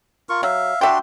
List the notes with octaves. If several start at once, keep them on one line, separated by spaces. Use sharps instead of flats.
F4 A#4 C#6
F#3 E5 F5
D4 F#4 E5 G5 C6